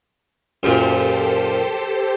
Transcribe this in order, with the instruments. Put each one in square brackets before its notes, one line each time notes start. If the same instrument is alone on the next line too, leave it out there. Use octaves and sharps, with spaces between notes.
[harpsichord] F#2 A#2 [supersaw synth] G4 A4 C5